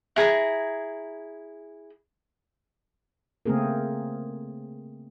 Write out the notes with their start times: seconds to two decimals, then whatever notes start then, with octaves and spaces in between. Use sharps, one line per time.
0.16 E4 G#4 A#5
3.46 C#3 A3 A#3 C4 G#4 A#4